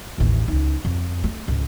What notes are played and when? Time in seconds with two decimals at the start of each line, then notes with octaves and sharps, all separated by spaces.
0.18 A1 D#2
0.48 C#2 D#4
0.85 F2
1.24 A3
1.48 C#2 G#2